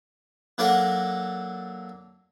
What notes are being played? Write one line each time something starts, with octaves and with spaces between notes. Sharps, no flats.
F#3 A#3 D4 A4 A#4 F#5